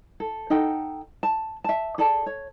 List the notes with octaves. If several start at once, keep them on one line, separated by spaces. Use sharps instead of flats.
A4
D#4 A4 F#5 G5
A5
E5 A5
G#4 A4 D5 A5
C#5